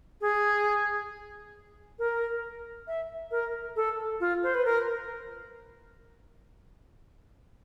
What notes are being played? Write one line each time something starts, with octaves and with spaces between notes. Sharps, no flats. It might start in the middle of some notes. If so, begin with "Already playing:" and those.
G#4
A#4
E5
A#4
A4
F4
C5
B4
A#4